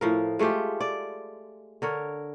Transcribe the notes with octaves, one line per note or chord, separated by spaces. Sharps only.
A2 F3 A#4
G#3 A3 F4 G4
D5
D3 A#4 C#5